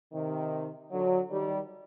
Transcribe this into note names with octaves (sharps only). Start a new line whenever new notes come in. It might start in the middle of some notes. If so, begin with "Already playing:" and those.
C3 D#3
D3 F#3
D#3 G3